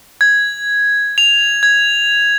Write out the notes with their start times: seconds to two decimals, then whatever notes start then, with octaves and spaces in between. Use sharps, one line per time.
0.21 G#6
1.18 F7
1.63 G#6